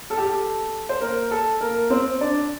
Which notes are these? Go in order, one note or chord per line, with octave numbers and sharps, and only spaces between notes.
A4
G4
A4
C5
A#3 A#4
A4
A#3 A#4
C4 C5
D4 D5